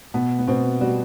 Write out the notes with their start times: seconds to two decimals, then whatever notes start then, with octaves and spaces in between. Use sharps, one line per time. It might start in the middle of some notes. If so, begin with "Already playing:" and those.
0.14 B2 B3
0.39 B3
0.47 B2 C4
0.81 G3 F#4